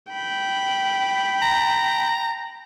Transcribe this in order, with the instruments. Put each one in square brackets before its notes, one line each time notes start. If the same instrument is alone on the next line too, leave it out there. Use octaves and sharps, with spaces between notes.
[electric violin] G5 B5
[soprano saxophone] A#5